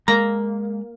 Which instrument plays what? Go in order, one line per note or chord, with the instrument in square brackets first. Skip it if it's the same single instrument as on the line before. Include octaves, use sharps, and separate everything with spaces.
[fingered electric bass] G#3 [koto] A#3 [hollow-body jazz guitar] A#5